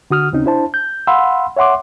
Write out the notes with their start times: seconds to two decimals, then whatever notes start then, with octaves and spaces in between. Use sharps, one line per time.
0.10 D3 F#4 D#6 F6
0.32 D#2 C#3 C4 C#4 D#4
0.45 D4 E4 C5 A5
0.74 G6
1.07 F5 F#5 B5 C6 E6
1.57 C#5 E5 F#5 C6 D6